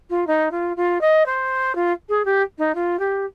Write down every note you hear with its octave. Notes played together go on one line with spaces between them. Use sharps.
F4
D#4
F4
F4
D#5
C5
F4
G#4
G4
D#4
F4
G4